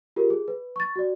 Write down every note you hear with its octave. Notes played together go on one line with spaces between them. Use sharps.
F4 G4 G#4 A#4
G#4
B4
C#6 A6
F#4 D5